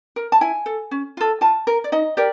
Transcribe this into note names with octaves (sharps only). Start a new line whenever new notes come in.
A#4
A5
E4 G#5
A4
C#4
F4 A4
F4 A5
A#4
D5
D#4 D#5
G4 A#4 D5